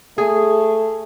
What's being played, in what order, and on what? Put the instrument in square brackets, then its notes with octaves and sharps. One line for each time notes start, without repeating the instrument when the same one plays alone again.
[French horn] A3 [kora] G#4